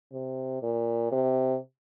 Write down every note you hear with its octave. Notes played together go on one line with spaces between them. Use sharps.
C3
A#2
C3